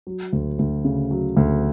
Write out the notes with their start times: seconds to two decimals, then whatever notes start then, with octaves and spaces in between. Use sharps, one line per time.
0.07 F#3
0.33 D2
0.59 D2
0.85 C#3
1.11 F#3
1.37 D2